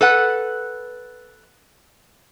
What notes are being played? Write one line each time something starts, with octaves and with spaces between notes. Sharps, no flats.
A4 B4 F#5